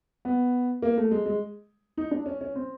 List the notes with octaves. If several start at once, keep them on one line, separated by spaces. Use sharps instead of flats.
B3
A#3
A3
G#3
G#3
D#4
D4
C#4
C#4
C4